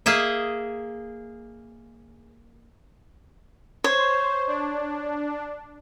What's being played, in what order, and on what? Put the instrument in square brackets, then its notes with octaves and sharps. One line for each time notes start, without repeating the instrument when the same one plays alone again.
[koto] A#3 G#4 D#5 E5
[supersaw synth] C5 [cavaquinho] C#5
[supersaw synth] D4